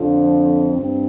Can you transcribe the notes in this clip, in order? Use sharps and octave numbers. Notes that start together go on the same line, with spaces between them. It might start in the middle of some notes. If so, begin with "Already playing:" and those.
Already playing: F2 D3 F3
C4
G2 C4